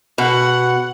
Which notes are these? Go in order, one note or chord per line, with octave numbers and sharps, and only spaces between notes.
B2 F#5